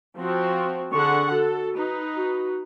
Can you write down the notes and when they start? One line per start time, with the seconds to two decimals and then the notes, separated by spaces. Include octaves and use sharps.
0.17 F3 C4 F#4
0.92 D3 G#4 F#5 C#6
1.31 F#4 A4
1.73 D#4 B4
2.16 F#4